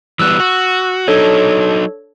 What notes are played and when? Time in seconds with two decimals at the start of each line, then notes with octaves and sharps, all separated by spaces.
0.19 E3 G3 B3 E6 F#6
0.40 F#4
1.08 F#3 D4 D#4 A4 C#5